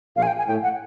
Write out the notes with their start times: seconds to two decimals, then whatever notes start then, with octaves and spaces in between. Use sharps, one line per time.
0.16 A#1 A#2 F5
0.22 G#5
0.27 G5
0.38 G#5
0.47 A2 G5
0.63 F#5